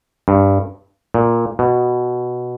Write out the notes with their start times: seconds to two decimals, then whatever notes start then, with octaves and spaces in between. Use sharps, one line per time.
0.28 G2
1.14 A#2
1.59 B2